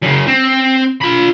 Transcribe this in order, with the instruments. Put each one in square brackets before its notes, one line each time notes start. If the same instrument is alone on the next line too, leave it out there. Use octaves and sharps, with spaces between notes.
[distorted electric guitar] F#2 C#3
C4
F4 B5